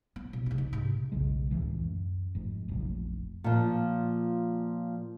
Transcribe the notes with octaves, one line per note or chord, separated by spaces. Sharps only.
B3
B2
C#3 D#4
D#4
G#2 C3
E1 B1 C#3 G#3
D1 C#2 E3 G#3
F#2
F1 G#2
F1 A#1 F#3
A#2 F3